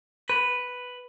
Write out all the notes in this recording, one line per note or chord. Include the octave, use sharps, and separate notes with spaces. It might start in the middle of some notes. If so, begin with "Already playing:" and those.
B4